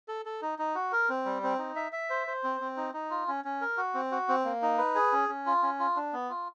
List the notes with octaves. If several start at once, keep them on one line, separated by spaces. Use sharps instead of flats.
A4
A4
D#4
D#4
F#4
A#4
C4
G3
C4
D#4
E5
E5
C5
C5
C4
C4
D#4
D#4
F4
C#4
C#4
A#4
F#4
C4
F#4
C4
A#3
D#4
B4
G#4
C#4
C#4
F4
C#4
F4
D4
B3
F4